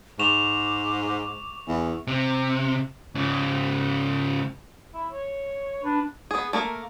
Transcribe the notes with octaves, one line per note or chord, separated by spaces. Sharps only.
G#2 C#6 D6 E7 F7
E2 G#5
C3
G#2 C#3
E4
C#5
D4 B4
B3 G#4
A3 A#3 A#4